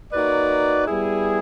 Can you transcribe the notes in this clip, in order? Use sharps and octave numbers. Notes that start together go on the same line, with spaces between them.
A#3 D#4 F#4 B4 D5
G3 B3 E4 G#4